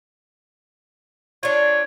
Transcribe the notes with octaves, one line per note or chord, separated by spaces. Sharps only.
D4 F4 C#5